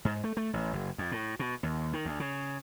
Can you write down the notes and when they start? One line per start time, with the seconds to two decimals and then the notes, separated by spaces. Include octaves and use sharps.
0.05 G#2
0.24 A3
0.37 A3
0.53 A1
0.73 F#1
0.98 F2
1.12 A2
1.39 B2
1.63 D#2
1.93 D#3
2.05 D2
2.20 C#3